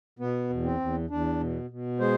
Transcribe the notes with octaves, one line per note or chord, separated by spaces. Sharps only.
B2 B3
E2
C4
E2
E2 D4
B2
B2
G#3 C5